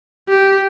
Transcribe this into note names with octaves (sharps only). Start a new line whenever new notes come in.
G4